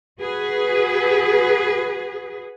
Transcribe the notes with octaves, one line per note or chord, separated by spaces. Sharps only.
F#4 G#4 B4